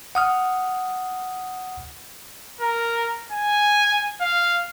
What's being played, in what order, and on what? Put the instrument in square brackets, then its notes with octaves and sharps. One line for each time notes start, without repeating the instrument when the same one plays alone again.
[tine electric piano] F#5 D#6 F6
[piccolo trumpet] A#4
G#5
F5